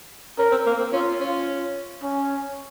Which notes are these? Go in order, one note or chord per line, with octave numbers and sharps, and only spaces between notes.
C#4 A#4
C4
A#3
C4
C#4 F4
C#4
C#4